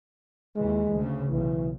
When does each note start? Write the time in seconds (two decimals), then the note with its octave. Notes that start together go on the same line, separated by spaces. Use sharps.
0.56 D#2 E3 G#3
0.93 D2 C#3
1.30 B1 C#3 E3